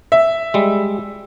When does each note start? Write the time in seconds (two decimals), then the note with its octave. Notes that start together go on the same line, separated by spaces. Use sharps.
0.12 E5
0.54 G3 G#3